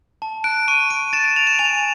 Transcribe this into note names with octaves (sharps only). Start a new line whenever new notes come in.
A5
F#6 D7
C#6 D#7
D7
A6 E7
E7
A6 F7
E7
G#5 F7